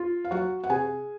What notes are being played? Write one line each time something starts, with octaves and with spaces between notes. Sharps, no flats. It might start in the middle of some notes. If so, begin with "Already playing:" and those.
Already playing: F4
F5
F#3 F#4 F#5
F#5
C3 G#4 G#5